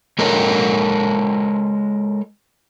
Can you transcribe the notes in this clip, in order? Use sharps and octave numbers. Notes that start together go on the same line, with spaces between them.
G#3 A4 A#4 C#5 D#5